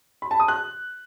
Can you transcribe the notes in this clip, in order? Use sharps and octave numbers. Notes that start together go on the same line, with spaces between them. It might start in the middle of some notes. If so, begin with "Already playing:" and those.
B5
A5
D#6
F#6